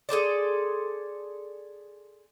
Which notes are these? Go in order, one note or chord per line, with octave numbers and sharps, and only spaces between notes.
G#4 A4 C5 D5